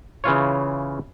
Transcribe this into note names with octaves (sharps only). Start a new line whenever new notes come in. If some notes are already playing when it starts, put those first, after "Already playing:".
C#3 E3 F4 C#5